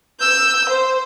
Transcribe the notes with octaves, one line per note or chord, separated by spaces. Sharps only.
E6 G6
C5